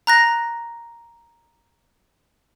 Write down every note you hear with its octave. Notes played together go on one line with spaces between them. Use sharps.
A#5 F#6 A#6